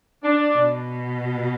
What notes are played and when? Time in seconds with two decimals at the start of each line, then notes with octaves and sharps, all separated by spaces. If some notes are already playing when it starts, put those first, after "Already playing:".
0.23 D4
0.54 B2